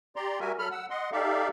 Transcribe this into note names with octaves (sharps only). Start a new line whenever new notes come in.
G4 D5 A#5 C6
G3 F#4 A#4 E5 G#5
F#3 A4 B5 F6
F#5 E6
D#5 F#5 C6
D#4 G4 A4 D5 E5 F5